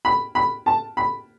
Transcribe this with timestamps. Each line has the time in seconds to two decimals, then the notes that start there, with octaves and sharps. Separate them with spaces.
0.05 B5
0.35 B5
0.66 A5
0.97 B5